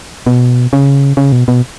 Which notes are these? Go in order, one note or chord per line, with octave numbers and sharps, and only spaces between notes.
B2
C#3
C#3
B2
B2